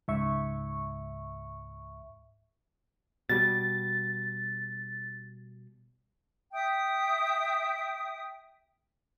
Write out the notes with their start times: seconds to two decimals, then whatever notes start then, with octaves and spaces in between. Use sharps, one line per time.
0.08 C#2 G#2 E5 C#6
3.29 B2 G3 A6
6.52 E5 G5 D#6